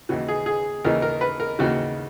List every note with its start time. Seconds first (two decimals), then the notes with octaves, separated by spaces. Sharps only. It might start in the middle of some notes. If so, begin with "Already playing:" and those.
0.09 D#2 C#3 E3 F#4
0.28 G#4
0.46 G#4
0.84 D#2 C#3 E3 A#4
1.02 A#4
1.21 B4
1.40 A#4
1.59 D#2 C#3 E3 F#4